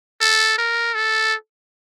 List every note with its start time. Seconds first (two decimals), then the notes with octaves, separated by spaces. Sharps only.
0.21 A4
0.58 A#4
0.95 A4